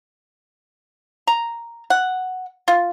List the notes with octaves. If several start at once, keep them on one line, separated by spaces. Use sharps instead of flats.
A#5
F#5
F4